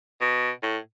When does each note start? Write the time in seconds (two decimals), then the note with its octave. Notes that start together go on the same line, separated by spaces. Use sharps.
0.21 B2
0.63 A2